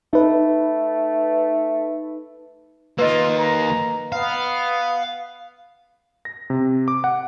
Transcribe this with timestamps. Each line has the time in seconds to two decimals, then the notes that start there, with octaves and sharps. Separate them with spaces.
0.13 A3 D#4 B4
2.99 D#3 A#3 F4 B4 D#5
3.37 A#5
4.12 B3 F5
6.25 A#6
6.50 C3
6.88 D6
7.04 F#5